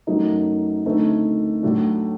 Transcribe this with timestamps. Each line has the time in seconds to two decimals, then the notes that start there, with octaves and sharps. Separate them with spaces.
0.07 F#2 F#3 A3 D#4
0.85 D2 D3 A3 C4 D#4
1.63 A2 F#3 A3 D4